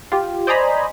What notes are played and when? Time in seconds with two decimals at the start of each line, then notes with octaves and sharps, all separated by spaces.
0.12 F4 G4
0.47 C5 D5 D#5 G#5 A#5 B5